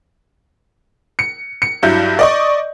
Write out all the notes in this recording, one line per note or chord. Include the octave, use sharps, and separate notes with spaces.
C#7
C#7
G2 F#3 E4 G6
D5 D#5 C#6